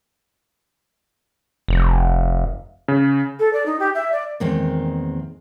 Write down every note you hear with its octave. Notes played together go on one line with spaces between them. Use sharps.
F1
C#3
A4
D5
D#4
G4
E5
D5
E2 A#2 D#3 G#3 C4